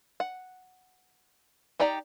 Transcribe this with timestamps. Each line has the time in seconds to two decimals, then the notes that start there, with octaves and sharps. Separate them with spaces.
0.20 F#5
1.80 D#4 G4 D5 G5 A#5